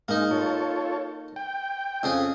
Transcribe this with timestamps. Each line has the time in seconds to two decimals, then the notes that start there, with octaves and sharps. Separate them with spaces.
0.08 G#2 G#3 A#3 D#4
0.31 F4 A4 C#5
1.36 G5
2.03 F2 C#3 G#4